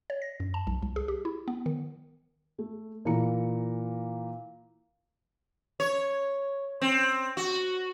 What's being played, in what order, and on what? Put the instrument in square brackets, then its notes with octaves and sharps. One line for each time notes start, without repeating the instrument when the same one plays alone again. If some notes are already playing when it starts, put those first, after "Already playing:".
[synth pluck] C#5
A#6
F#2
A5
B1
C2
G#4
G4
E4
B3
D#3
[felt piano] A3
A#2 E3 A#5 C#7
[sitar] C#5
C4
F#4